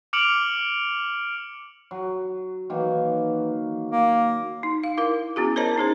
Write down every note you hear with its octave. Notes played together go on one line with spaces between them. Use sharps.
D6 F6 C#7 D7 F7 F#7
F#3
D#3 E3 F#3 A#3
A#3
D#4
F5
E4 A#4 F5
B3 C#4 E4 F#4 G#4
A#4 C5 C#5 D#5 A5 A#5
C#4 D#4 G#4 C5